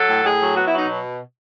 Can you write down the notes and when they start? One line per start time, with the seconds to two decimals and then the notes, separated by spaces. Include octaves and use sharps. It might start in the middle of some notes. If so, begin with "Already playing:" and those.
Already playing: F#3 A4
0.09 A2
0.25 A2 G#4
0.41 F#3
0.56 B3 F#4
0.67 E4
0.72 F#3 D#4
0.87 B2